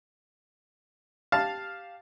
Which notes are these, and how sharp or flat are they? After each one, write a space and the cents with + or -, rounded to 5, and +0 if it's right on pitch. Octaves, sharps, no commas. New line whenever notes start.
G4 +0 F5 +0 A5 +0